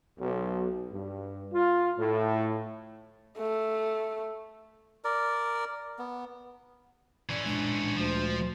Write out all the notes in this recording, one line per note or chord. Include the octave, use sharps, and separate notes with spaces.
B1
G2
F4
A2
A3
A#4 D5
B3
E3 C#4 D5
A#2 G#3 D4
D2 F3